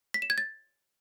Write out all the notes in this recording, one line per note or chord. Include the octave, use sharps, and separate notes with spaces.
B6
E7
G#6
A6